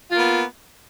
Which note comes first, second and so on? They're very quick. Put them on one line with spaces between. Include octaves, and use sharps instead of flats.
F4 A#3 B3